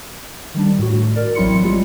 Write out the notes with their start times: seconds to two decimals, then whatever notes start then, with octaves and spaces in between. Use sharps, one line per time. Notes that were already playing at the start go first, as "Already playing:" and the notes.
0.54 D#3 G3 D4
0.78 A2 F#4
1.16 A#4 D5
1.35 A1 F#3 C4 E4 C6 C#7
1.63 G3 G#3 F4